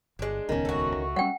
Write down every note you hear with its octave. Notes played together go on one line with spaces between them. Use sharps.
G1 G#3 D4
D#1 C#2 D#3 B3 C#4
A3 F#4
C#2
G3 C#4 F#5 G5